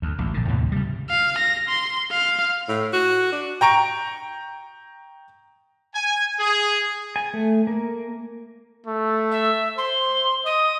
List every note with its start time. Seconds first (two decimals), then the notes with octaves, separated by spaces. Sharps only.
0.02 D2
0.18 A1 D2
0.34 A#1 D3
0.48 D#2 A2 C3 E3
0.72 C#3 G3
1.10 F5
1.38 A#6
1.69 C6
2.11 F5
2.69 A2
2.93 F#4
3.32 D4
3.61 G5 A#5 C#6 D7
5.94 G#5
6.40 G#4
7.16 G#5
7.34 A3
7.67 A#3
8.86 A3
9.31 E5
9.77 C5 C6
10.45 D#5 D#6